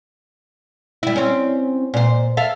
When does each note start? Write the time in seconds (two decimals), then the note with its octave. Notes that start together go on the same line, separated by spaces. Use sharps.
1.03 G3 E4
1.16 C4 C#4
1.94 A#2 C5
2.37 A4 E5 F5